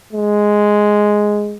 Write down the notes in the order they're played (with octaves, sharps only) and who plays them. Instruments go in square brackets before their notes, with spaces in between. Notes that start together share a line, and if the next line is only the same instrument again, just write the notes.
[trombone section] G#3